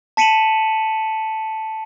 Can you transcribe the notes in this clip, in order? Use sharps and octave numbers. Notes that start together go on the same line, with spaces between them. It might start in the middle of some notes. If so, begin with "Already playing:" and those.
A5 B6 C#7 D#7 E7 F#7